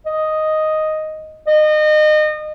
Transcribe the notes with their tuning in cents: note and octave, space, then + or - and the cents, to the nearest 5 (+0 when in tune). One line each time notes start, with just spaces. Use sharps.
D#5 +0
D#5 -30